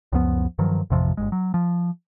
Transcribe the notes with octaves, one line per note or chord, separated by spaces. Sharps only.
C#2 F#2 F3 B3
G2 D#3 F3 F#3
A1 F2 C3 F3
G1 C#2 G#3
F#3
F3